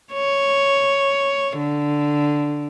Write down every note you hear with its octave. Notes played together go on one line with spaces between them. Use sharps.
C#5
D3